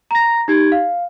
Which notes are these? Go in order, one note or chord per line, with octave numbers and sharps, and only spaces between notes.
A#5 A#6
D#4 G4 G#6
F5